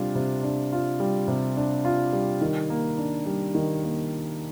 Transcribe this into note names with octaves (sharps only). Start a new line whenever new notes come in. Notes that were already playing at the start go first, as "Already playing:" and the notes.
Already playing: C3 G3 D4 F4
C3
D4
F4
G3
C3
D4
F4
G3
D#3
A#3
D4
G3
D#3
A#3